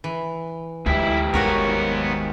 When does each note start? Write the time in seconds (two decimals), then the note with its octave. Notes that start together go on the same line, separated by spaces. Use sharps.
0.04 E3
0.86 D2 G#2 E4 G4 E5
1.34 G1 D#2 A#3 B3 F#4 A#4 C#5